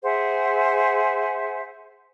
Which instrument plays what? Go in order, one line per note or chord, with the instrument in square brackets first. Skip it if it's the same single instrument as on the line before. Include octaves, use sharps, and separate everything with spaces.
[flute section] G#4 C5 E5 F#5